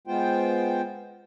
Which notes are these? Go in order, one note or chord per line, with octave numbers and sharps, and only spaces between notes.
G#3 B3 F4 C5 G5